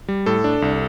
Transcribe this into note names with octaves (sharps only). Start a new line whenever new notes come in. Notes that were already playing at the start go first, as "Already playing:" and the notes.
G3
A2 A4
D4
C2